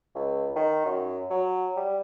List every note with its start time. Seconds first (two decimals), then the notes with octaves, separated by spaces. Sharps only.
0.15 C#2
0.56 D#3
0.85 F#2
1.30 F#3
1.77 G3